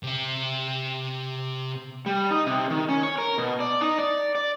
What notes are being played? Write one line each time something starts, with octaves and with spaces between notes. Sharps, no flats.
C3 E5
G3
D#4
C3
D#3
C#4
C#5
A#4
B2
D5
D#4
D5
D5